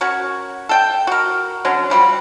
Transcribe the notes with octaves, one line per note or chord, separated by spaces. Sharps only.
C#4 F#4 A#4 C#5
A4 G5
F#4 A#4
D3 F#3 C#4
F3 G3 F4 F#4